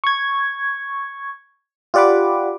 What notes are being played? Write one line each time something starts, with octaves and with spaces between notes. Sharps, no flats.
C#6 G#6
F4 G4 D5 F#5 B5 D6